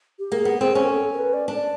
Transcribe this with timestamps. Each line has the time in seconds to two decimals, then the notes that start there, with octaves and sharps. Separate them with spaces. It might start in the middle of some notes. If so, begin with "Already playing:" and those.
0.19 G4
0.31 A#3 G#4
0.45 B3
0.60 C4 G#4
0.75 C#4 G#4
0.84 A#4
0.89 A4
1.13 A#4
1.18 B4
1.34 D5
1.48 D4
1.55 D5